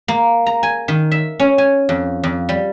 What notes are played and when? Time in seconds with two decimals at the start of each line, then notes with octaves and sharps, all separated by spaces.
0.08 A#3
0.46 A#5
0.63 G#5
0.88 D#3
1.11 E5
1.40 C#4
1.58 G#5
1.89 F2
2.23 F2
2.49 G3